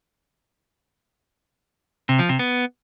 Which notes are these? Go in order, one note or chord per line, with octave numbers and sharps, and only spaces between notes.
C3
F3
C3
B3